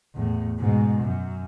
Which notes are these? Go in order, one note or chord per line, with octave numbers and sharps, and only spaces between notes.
E2 A2
G#2 B2
F#2